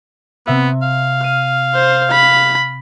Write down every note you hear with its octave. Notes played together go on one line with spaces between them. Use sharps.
C3 B3 E5
F5
F6 D#7
C5
B5